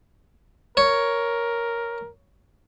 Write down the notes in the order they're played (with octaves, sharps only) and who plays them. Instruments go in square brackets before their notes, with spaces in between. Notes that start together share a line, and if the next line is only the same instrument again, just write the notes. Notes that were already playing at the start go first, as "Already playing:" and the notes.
[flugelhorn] A#4 [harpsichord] C#5